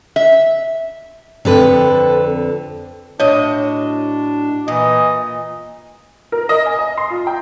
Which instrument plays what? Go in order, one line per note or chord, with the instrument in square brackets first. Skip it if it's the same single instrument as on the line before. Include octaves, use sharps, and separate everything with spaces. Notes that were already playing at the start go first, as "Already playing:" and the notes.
[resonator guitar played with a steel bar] E5
[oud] F2 D3 [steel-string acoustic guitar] C4 A4 B4
[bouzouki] A2 F#4 D#5 [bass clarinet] D4 [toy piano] C#5
[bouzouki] A#2 [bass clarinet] E3 [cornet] D#5
[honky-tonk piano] A#4
D#5
G#5
D#5
C6
F4
G5